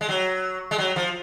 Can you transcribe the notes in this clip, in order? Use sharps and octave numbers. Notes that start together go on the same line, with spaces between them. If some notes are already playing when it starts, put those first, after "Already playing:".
G#3
F#3
G#3
F#3
F3